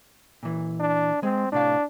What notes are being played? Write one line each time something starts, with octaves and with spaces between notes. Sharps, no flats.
A#2 E3
D4
G#3 C4
A2 C3 D4 F5